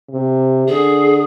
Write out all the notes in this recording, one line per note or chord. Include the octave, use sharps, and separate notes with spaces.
C3
D3 G#4